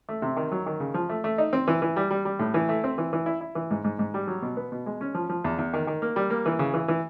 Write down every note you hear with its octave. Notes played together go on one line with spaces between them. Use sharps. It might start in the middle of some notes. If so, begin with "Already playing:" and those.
A3
C3
D#3
F#3
D#3
C#3
F3
A3
A3
D#4
C4
E3
E3
G3
G3
G3
A2
E3
A3
C4
E3
E3
E4
E4
E3
G#2
G#2
G#2
G3
F#3
B2
B3
B2
G#3
C#4
F3
F3
E2
E2
D#3
D#3
A#3
G3
A#3
E3
C#3
E3
E3